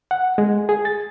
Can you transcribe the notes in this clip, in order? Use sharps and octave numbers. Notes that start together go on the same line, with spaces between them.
F#5
G#3
G#4
A6